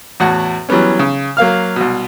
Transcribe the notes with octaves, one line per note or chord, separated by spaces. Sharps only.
E2 A2 F#4 F#5
E3 F#3 G3 B3 C#4
C#3
F#3 A#3 F5 F6
C2 B2